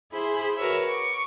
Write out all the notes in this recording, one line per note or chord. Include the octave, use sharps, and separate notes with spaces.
E4 G#4 C5 B5
F#4 A#4 B4 C#5 E5
C#6 D6